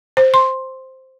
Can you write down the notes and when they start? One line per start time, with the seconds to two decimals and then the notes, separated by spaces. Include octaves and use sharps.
0.17 C5
0.34 C6